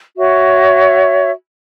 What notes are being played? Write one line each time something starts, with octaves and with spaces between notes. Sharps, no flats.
F#4 C#5 E5